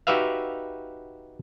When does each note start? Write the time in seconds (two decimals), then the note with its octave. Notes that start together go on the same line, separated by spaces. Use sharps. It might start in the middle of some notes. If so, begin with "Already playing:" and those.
0.07 D#4 F#4 G4 B4 E5 F5